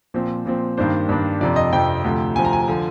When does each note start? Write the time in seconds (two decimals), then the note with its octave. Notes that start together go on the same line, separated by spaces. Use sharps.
0.14 A#2 F3 C4
0.46 A#2 F3 C4
0.77 G2 D#3 A#3 D4 C5
1.09 G2 D#3 A#3 D4
1.41 F2 C3 F3 D5
1.56 D#5
1.73 F2 C3 F3 G5
2.04 D2 C3 F3
2.36 D2 C3 F3 G#5
2.45 A#5
2.53 G#5
2.68 D3 F3